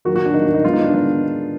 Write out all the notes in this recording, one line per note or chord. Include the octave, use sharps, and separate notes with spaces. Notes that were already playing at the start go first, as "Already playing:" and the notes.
D#3 F#3 A#3 F#4
F#4
D4
D#3 F#3 A#3 D#4
D4
D#4
D#3 G#3 B3 F4
D#4
D4
D#3 G#3 B3 D#4